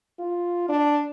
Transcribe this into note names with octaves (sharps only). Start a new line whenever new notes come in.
F4
D4